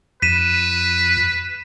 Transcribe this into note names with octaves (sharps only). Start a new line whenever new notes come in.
F2 B4 B6 D#7 E7